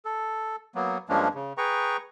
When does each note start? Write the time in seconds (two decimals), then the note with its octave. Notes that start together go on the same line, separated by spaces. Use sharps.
0.05 A4
0.75 F#3 A#3 B3
1.09 G2 F3 G#3 A#3 C#4 D4
1.35 C#3
1.57 G#4 B4 G5 A#5 C#6